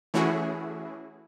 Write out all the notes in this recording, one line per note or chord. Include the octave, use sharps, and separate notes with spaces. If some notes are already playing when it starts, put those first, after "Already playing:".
E3 A3 C#4 E4 F#4 G#4